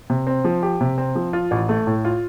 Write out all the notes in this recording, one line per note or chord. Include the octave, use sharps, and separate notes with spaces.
C3
C4
F3
G4
C3
C4
F3
F4
A1
A3
A2
F4